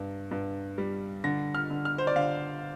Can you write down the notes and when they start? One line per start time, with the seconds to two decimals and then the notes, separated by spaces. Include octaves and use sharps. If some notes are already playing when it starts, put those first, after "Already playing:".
Already playing: G2
0.31 G2
0.78 G3
1.24 D3 A#6
1.55 F6
1.70 D3
1.85 F6
1.98 C5
2.07 D5
2.16 D3 F5